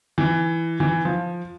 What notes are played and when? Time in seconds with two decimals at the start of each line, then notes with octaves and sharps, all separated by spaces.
0.18 E3
0.80 E3
1.05 F3